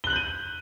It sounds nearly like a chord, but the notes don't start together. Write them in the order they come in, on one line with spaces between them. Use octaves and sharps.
G7 F#6 F#7 G6 D#7